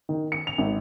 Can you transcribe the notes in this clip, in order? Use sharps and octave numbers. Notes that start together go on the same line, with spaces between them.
D#3
C#7
F7
G#1